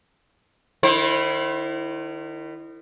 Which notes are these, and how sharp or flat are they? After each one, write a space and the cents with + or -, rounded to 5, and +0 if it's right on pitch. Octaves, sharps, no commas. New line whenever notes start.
D#3 -35 E4 +0 C5 +30